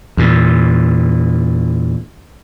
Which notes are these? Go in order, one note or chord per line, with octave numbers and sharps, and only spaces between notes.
E2 A#2